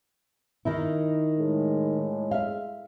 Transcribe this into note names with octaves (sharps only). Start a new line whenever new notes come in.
D#3 D#4 E4
A2 G#3
E5 F5